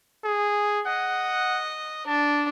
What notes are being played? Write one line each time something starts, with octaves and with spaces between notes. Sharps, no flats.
G#4
D#5 F#5
D4 A5